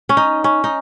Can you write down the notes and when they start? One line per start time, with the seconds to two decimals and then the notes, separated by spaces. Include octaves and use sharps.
0.09 C#4
0.17 D#4
0.44 C#4
0.64 D#4